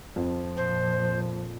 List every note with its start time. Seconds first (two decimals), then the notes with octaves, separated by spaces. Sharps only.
0.16 F2 F3
0.57 A#2 C5